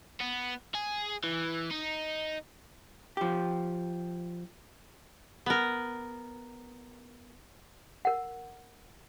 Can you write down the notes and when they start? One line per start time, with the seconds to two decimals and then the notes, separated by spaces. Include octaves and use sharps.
0.21 B3
0.75 G#4
1.24 E3
1.71 D#4
3.17 F3 G4
5.46 B3 A#4
8.05 A#4 F#5